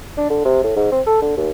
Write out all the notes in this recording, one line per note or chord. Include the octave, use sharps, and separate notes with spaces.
D4
D3
C3
A2
G#2
C4
A4
D3
D#2